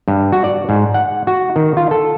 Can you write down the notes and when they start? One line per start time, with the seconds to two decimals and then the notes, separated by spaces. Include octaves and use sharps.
0.08 G2
0.32 F#4
0.44 D5
0.69 G#2
0.94 F#5
1.27 F#4
1.56 D#3
1.77 F4
1.91 A4